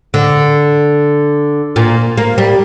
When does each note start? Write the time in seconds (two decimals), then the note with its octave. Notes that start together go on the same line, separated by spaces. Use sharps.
0.14 D3
1.76 A#2
2.17 A#3
2.38 G3